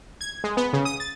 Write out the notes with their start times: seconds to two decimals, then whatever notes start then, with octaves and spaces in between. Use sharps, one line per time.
0.21 G#6
0.44 G#3
0.57 B3
0.73 C#3
0.85 D#6
1.00 A6